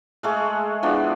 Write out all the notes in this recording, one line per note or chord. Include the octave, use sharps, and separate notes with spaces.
G#3 A3 G#4
F3 B3 D4 E4